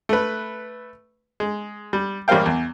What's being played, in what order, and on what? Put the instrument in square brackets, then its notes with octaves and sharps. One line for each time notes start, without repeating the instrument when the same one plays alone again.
[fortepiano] A3 B4
G#3
G3
A1 G3 A#3 C5 F5 G5
E2